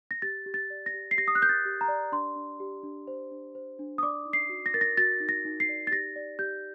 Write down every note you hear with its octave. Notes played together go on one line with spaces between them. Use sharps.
A#6
G4 A6
G4
A6
D5
A#6
G4
C7
G4 A#6
D#6
F#6
A#4 G6
A6
G4
A#5
D5
D4 C6
D4
G4
D4
C5
D4
C5
D4
D#6
D5 D6
D#4
C7
F#4
A#6
A#4 A6
A#6
F#4 A6
D#4
A#6
D#4
C7
D5
A6
G4 A#6
D5
G4 G6